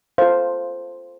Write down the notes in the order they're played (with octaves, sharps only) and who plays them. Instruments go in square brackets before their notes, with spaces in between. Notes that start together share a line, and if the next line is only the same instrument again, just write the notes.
[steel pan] F4 A4 C5 F5